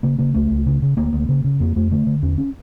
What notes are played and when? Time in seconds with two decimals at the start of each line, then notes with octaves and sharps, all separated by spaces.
0.03 C#3 A#3
0.19 C#3 A#3
0.34 C#2 A3
0.50 C#2
0.66 C#3
0.82 C#3
0.97 D2 A#3
1.13 D2
1.29 C#3
1.44 C#3
1.60 F2 A#3
1.76 F2 A3
1.91 D3 A3
2.07 D3
2.22 E2 C#4
2.38 C#4